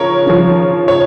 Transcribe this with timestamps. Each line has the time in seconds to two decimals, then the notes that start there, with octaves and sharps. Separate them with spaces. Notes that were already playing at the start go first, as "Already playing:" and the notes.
Already playing: C#3 F3 A#4 C#5
0.27 C#3 F3
0.88 C#5